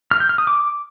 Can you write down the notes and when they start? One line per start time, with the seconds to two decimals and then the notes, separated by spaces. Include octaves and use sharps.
0.11 F6
0.20 G6
0.29 F6
0.38 D#6
0.47 D6